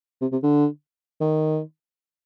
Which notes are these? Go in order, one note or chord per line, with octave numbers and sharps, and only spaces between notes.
C3
C3
D3
D#3